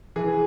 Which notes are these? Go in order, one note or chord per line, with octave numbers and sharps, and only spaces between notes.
E3 G#4